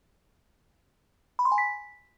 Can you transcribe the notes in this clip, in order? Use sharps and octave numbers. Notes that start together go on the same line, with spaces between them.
B5
C6
G#5
B6